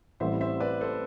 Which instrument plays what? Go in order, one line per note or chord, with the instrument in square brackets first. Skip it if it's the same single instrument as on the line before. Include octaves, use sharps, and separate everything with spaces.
[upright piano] A1 A2 E3 G3 C4 [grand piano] C5 E5
[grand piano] C5 E5
B4 D5
A4 C5